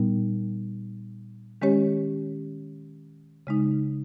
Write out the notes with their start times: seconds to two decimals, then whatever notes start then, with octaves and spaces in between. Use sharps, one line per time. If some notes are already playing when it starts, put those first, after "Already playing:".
Already playing: A#2 G3 B3 D#4
1.62 D#3 G#3 C#4 G4 C#5
3.47 C#3 G#3 D#4